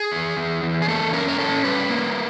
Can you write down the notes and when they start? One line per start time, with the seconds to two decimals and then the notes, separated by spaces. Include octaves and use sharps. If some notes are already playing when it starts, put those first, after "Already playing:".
Already playing: G#4
0.12 E2
0.37 E2
0.63 E2
0.82 G#4
0.88 A#3 A4
1.13 C#4 A#4
1.29 A#4
1.38 C#4 A4
1.64 G3 B4
1.90 A#3